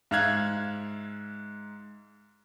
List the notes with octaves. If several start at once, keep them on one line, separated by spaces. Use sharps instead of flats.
G#2 E5 F5 F6 F#6 G#6